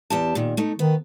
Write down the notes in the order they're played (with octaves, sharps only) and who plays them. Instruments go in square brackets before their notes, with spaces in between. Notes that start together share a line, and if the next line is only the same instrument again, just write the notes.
[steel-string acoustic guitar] E2 G4 A5
A#2 D#3
A3 D#4
[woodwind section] D#3 [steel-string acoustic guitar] B3